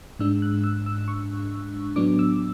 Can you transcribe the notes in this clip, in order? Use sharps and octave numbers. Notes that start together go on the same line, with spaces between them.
G#2 G#3 D4 E6
F#6
E6
E6
C#6
A2 F#3 B3 D4 D6
E6